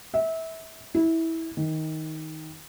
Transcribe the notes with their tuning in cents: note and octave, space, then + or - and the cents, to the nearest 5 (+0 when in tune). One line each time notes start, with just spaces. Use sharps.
E5 -25
E4 -15
D#3 +15